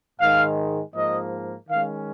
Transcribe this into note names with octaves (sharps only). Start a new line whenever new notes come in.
G#2 D#3 G#3 F5
G#2 F3 A#3 D#5
D#3 G#3 C#4 F5